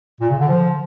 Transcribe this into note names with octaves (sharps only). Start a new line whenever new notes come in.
A#2
C#3
D3
F3